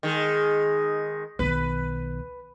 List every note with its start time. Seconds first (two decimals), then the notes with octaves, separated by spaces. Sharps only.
0.03 D#3 G#3
1.39 B1 D#3 B4